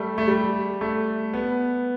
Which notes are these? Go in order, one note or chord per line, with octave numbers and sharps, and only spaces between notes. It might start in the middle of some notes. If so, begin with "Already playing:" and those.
Already playing: G3 A3
A3
G3
A3
B3